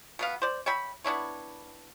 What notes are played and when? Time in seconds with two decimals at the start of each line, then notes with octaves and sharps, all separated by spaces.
0.19 B2 B3 F5
0.42 C5 D5
0.66 C#5 E5 G5 B5
1.04 B3 D4 E4 C#5